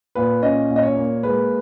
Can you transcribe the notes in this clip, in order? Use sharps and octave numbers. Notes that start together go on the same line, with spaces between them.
A#2 B4
C#4 D#5
A#2
D#5
C#5
A#3
G#3 B4